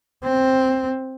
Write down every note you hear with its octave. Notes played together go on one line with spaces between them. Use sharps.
C4